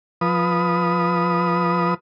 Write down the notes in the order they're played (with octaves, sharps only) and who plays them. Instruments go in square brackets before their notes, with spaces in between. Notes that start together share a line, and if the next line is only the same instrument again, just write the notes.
[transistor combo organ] F3 B4 D#6